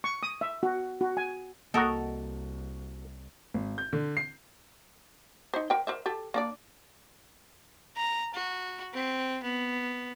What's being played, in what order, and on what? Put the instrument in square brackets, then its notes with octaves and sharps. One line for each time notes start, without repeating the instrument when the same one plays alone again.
[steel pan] C#6
D#6
E5
F#4
F#4
G#5
[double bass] C2 [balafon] A#3 F#5 A#5 [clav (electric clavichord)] F#4 D#5 [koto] A4 A#4
[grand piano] G#1
G6
D3
C7
[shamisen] D#4 C5
A#4 C5 G5
A#4 C5 E5
G4 A4
A#3 D4 D5
[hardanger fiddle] A#5
F#4
C4
B3